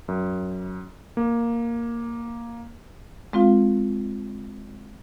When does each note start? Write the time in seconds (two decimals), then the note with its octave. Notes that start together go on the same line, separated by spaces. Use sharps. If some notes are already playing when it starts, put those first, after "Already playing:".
0.08 F#2
1.17 A#3
3.33 G#3 C4 F4 F5